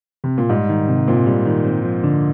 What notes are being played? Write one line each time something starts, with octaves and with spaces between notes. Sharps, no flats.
C3
A#2
G#2 G3
D#3
C3
A#2 C4
G3
D#3
C4
F3
D3